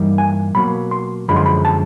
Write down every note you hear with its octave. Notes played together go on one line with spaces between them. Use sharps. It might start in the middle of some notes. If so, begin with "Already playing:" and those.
Already playing: G2 E3 G3 A#3 D#4
G#5
B2 F#3 A#3 B5
C6
F#2 D3 F3 G#3 B5
C6
B5
A5